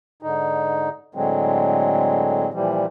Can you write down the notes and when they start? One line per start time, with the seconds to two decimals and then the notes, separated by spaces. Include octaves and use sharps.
0.22 G#2 D3 D#4
1.15 A2 D3 F#3 G#3 C4
2.53 A#2 E3 F3 G3